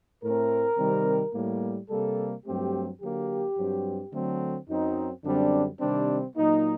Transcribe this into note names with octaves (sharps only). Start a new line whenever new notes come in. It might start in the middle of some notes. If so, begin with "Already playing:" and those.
A2 A3 C4 A#4
C3 D#3 G3 C4
A2 G3 A#3
C3 G3 A#3 A4
G2 F#3 A3 C4 G4
D3 F#3 A#3 G4
G2 F#3 C4
D3 F#3 A3 C4
F#2 F#3 C4 D#4
F#2 D3 G3 C4 D4
C3 D#3 G3 C4 D4
A#2 F#3 A#3 D#4